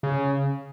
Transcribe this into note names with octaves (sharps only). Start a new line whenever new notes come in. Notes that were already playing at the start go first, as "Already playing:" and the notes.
C#3